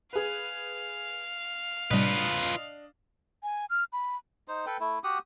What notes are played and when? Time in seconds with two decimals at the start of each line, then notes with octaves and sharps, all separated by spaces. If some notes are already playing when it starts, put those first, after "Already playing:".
0.13 G#4 B4 F5
1.91 A2 C3 G3 D4 F4 B4 D#5
3.43 G#5
3.70 F6
3.93 B5
4.48 D#4 C5
4.66 A4 B4 G5
4.80 A3 E4
5.04 F#4 G4 F#5 D#6